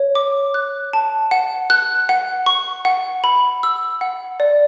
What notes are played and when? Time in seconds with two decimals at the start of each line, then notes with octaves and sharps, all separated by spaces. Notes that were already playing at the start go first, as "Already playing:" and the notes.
Already playing: C#5
0.15 D6
0.54 F#6
0.93 A5
1.31 F#5
1.70 F#6
2.09 F#5
2.46 C#6
2.85 F#5
3.24 B5
3.63 E6
4.01 F#5
4.40 D5